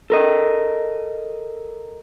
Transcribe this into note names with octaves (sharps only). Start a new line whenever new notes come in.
A4 A#4 D#5